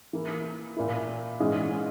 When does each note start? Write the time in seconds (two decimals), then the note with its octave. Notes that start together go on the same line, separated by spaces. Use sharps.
0.13 E3 A#3 E4
0.77 A#2 A#3 E4
1.40 G#2 E3 G#3 C#4 G#4